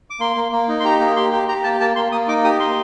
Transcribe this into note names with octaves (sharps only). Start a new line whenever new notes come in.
D6
A#3 C6
A#3
A#3
D#4
C6
G4 A#5
A#3
G4 C6
G4
G4 A#5
A#3 A5
A#3 A5
A#3 C6
A#3 D#6
D#4 D6
G4 D#6
A#3 C6